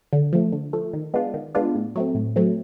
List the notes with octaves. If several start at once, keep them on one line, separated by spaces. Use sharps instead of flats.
D3
F3 A3
D3
F3 A3
D#3
G#3 B3 D4 F4
D#3
G#3 B3 D4 F4
A2
F#3 A3 C4
A2
F#3 A3 C4